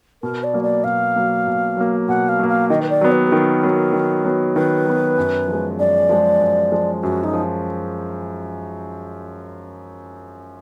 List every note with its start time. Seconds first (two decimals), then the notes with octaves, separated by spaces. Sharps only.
0.22 B2 A#4
0.43 D5
0.53 F#3 A#3
0.63 D5
0.84 B2 F5
1.16 F#3 A#3
1.47 B2
1.77 F#3 A#3
2.08 B2 F#5
2.29 F5
2.39 F#3 A#3
2.49 F5
2.69 D#3 D#5
2.82 B4
2.90 D5
3.01 F#3 B3
3.12 B4
3.27 G#4
3.31 D#3 A#4
3.63 F#3 B3
3.93 D#3
4.24 F#3 B3
4.56 D#3 B4
4.86 F#3 B3
5.18 F#2
5.47 F3 G#3
5.79 F#2 D5
6.09 F3 G#3
6.40 F#2
6.72 F3 G#3
7.02 F#2 F#4
7.24 D#4
7.33 F3